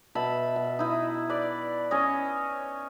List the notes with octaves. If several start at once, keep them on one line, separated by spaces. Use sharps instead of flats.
B2 E5 A5 B5
B2
D#4 E4
B4 D5
C#4 C#5 D#5